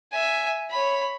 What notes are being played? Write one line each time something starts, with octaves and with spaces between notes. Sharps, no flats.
E5 G#5
C#5 B5